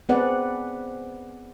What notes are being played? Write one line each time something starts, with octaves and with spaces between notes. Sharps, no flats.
B3 C4 G#4 B4 D5 F#5